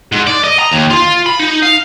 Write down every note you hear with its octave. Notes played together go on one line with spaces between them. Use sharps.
G#2
D5
D#5
A#5
D#2
F4
B5
D#4
F5